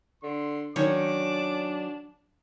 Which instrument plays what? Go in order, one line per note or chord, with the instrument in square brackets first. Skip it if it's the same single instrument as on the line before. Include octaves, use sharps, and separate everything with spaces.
[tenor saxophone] D3 [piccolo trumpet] C6
[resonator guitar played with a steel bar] D#3 C#4 [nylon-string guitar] F#3 C#5 [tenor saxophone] D4 [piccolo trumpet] D6